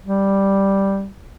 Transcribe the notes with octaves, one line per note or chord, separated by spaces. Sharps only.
G3